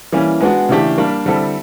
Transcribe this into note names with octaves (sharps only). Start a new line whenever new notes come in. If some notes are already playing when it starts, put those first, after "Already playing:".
E3 G3 A#3 C#4
G#3 B3 D4 F#4
C#3 E3 A3 D4 G4
G3 A#3 D4
D3 G3 C4 E4 A4